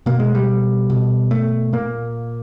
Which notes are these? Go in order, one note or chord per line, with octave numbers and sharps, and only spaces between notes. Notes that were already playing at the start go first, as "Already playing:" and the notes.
B2 A#3
G#3
G3
B2
A3
A#2 A#3